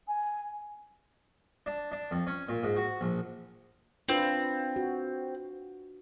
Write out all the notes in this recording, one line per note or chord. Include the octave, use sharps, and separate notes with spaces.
G#5
D4
D4
F2
C#4
A#2
G#2
F#4
A#1
C4 D4 F4 B4
F#4